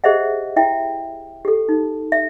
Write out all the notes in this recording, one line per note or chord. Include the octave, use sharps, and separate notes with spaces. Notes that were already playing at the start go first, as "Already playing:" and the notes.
G4 G#4 C5 D#5 E5 F#5
E4 E5 G5
G4 A4
D#4
E5